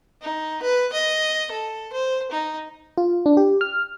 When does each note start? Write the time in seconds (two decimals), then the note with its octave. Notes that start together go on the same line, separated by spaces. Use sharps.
0.21 D#4
0.62 B4
0.93 D#5
1.51 A4
1.93 C5
2.32 D#4
2.98 F4
3.26 D4
3.37 G4
3.61 F6